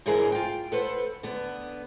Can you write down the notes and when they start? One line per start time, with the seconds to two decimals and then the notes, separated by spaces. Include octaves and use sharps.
0.06 G#2 D3 E3 G#4 A#4 C5
0.32 F4 G5
0.72 A4 B4 C5 F#5
1.23 D3 B3